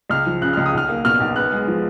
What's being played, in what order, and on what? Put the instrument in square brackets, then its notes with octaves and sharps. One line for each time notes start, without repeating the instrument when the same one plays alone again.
[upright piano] C#2 F6
F3
C#3 F#6
C#2 F6
D#6
B1 F6
A#3
B2 F6
B1
B3 F#6
G#3
F3